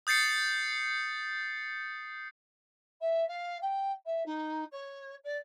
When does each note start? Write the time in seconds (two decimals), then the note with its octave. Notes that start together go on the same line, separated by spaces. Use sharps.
0.07 D#6 G6 A6 C7 C#7
3.01 E5
3.28 F5
3.61 G5
4.05 E5
4.25 D#4
4.71 C#5
5.24 D5